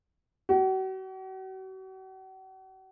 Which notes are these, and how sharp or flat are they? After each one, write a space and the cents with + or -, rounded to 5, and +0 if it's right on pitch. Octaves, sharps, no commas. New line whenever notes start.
F#4 +40